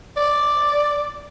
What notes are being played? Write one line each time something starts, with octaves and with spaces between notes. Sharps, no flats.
D5